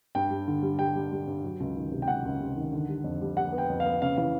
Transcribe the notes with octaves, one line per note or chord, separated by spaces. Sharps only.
G2 G5
G3
D3
G3
G3 G5
G3
G3
G2
F#3
C#2
D#3
C3
G5
C#2 F#5
C#2
C3
D#3
D3
G3
F2
G3
G3 F#5
B3
G5
F2
F5
B3
C#3 F5
E3 F5